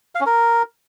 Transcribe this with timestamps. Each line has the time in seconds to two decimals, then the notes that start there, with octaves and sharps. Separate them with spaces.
0.15 F5
0.21 C#4
0.26 A#4